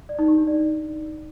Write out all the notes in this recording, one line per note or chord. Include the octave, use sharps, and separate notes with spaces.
D5
D#4
G4
D4
D5